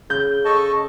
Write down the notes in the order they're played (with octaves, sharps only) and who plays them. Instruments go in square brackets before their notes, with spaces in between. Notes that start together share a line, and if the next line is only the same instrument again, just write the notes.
[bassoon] C#3 [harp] G6
[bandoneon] A4 D#5 A5 [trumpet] C#6